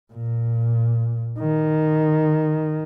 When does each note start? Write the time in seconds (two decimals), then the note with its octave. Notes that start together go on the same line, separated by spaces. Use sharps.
0.13 A#2
1.39 D#3